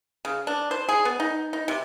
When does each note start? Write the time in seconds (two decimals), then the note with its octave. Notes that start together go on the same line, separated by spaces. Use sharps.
0.25 C#3
0.47 D4
0.71 C5
0.89 G#4
1.05 B3
1.20 D#4
1.53 D#4
1.68 C3